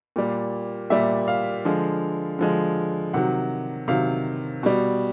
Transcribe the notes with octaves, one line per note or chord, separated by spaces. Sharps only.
A#2 G3
A#2 G3 E5
F5
D3 F3 G#3
D3 F3 G#3
C3 D#3 F#3 F#5
C3 D#3 F#3 F5
B2 G3